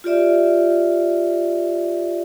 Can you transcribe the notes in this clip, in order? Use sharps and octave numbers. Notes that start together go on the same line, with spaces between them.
F4 G4 D5 E5